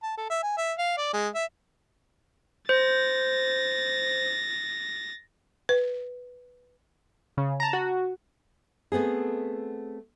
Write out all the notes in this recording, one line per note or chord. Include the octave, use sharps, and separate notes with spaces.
A5
A4
E5
G#5
E5
F5
D5
G#3
E5
C5 A6 A#6
B4
C#3
A5 A#5
F#4
A3 B3 C4 G#4